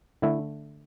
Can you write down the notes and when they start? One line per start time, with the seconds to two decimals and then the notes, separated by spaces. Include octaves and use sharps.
0.22 D3 A3 E4